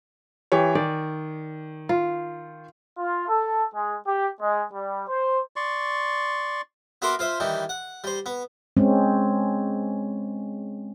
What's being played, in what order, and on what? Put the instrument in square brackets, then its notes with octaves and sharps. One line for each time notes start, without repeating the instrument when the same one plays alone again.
[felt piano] E3 G4 C#5
[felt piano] D#3 [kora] D5
[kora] F4
[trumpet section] F4
A4
G#3
G4
G#3
G3
C5
[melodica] D5 C6 C#6
[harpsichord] B3 F#4 A#4 E5 C6 D6
F4 C5 E5
D#3 E3 G3
F#5
G3 C5
B3
[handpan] G#3 C4 C#4